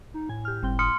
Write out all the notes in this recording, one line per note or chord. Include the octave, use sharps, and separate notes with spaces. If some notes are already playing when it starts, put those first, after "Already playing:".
D#4
A2 G#5
G4 F6
G1 G3 C4 G5
C6 D#6 F6 C#7